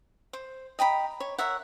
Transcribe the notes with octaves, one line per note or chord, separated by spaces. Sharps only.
C5
D#5 G5 A#5 B5
C#5
A#4 C#5 E5 F#5